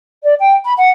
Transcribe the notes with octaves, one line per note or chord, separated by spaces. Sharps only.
D5
G5
B5
F#5